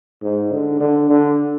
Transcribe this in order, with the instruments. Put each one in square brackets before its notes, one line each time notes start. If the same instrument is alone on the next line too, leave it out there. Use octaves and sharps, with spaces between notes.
[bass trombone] G#2
D3
D3
D3